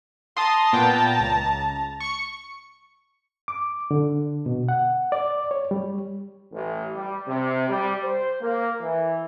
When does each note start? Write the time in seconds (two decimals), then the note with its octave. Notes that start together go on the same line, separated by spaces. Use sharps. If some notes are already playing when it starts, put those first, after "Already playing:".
0.37 A5 A#5 C6 D#6
0.73 A#2 B3 G5
1.20 C#2
2.00 C#6 C#7
3.48 D6
3.91 D3
4.46 B2
4.69 F#5
5.12 D5
5.51 C#5
5.71 G3
6.52 A1
6.94 G3
7.27 C3
7.68 G3
8.03 C5
8.41 A#3
8.81 E3